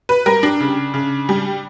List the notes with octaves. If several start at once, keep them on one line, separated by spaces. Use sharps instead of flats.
B4
G3 A#4
D4
C#3
C#3
G3